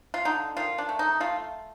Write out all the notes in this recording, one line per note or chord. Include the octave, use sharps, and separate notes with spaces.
F4
D3 D#4
D#3 F4
D4
A3
D#4
A3 F4